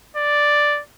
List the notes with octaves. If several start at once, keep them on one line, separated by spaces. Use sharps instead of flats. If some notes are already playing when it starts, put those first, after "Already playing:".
D5